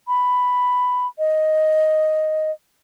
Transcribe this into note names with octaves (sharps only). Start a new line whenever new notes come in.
B5
D#5